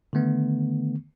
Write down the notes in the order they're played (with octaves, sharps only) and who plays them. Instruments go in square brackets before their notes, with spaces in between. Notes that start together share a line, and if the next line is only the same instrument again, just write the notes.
[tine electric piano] D3 D#3 A3 B3